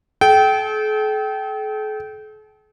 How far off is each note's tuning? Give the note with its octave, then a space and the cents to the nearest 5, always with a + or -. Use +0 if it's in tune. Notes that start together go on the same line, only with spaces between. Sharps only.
A4 -45 G5 -20